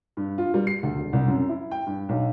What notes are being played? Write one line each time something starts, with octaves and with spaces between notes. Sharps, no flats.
G2
F4
G3
C7
D2
E1
C2
F#2
E4
G5
G2
B1